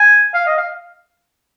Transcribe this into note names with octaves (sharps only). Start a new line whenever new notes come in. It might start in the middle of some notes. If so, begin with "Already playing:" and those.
Already playing: G#5
F5
D#5
F5